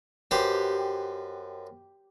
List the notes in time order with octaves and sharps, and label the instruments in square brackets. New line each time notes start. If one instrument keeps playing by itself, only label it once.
[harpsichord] F#2 B4 C5 [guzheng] G4